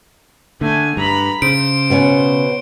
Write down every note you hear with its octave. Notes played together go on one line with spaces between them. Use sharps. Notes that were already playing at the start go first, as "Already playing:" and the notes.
D3 A3 G#5
G2 A#5 B5
C#3 C5 D7
B2 B3 C#4